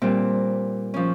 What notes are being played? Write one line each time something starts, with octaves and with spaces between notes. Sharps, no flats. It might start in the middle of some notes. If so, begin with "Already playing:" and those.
A#2 G3 C4
F3 C#4